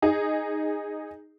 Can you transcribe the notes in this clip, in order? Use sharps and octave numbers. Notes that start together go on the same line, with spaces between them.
D#4 G#4